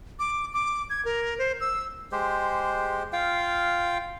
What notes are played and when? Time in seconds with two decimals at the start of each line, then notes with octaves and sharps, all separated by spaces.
0.19 D6
0.54 D6
0.90 G#6
1.05 A#4
1.38 C5
1.60 E6
2.12 G#3 G4 C5
3.13 F4 F5 G5